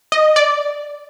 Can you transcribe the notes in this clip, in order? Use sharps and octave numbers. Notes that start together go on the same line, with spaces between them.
D#5
D5